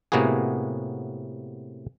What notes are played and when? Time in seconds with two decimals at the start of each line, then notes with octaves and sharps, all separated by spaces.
0.12 A2 C3 A#3 B3 F#4 G#4